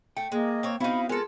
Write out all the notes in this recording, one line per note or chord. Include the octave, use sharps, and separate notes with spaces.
A3 G5
G#3 A#3 D#5
C4 C#5
B3 C4 D#4 E4 F#4 F5 B5
G#3 F4 A4 A#4